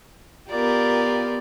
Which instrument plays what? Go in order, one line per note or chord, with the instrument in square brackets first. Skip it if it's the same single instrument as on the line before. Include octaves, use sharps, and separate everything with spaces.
[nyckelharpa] B3 D5 [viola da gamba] F4 G4 A#4